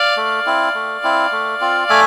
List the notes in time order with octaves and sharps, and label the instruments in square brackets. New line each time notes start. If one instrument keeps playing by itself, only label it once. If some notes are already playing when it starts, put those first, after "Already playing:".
Already playing: [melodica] D5 F5
A3
C4 E4
A3
C4 E4
A3
C4 F4
A3 E5 G#5